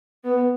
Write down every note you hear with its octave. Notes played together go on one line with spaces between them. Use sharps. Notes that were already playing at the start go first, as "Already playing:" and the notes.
B3